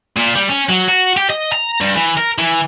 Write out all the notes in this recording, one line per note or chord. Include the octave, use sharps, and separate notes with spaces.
A#2
G3
C#4
F#3
F#4
G4
D#5
A#5
G2
E3
A#4
E3